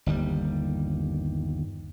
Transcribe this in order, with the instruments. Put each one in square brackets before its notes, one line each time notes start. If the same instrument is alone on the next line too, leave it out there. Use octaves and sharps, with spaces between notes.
[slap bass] G1 D#2 G3